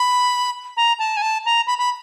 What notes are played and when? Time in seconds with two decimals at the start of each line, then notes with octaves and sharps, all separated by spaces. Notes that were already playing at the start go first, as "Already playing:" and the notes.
Already playing: B5
0.77 A#5
0.99 A5
1.17 G#5
1.22 A5
1.45 A#5
1.67 B5
1.78 B5